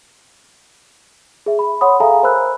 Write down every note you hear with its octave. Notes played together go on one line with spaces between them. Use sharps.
G#4 E5
B5
C#5 F#5 B5 C6 D#6
G#4 A4 E5 F5 G#5 A#5
A#4 C5 A#5 B5 E6 F#6